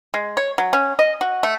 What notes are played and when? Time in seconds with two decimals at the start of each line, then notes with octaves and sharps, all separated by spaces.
0.14 G#3
0.37 C#5
0.58 F#3
0.73 C#4
0.99 D#5
1.21 F#4
1.43 A3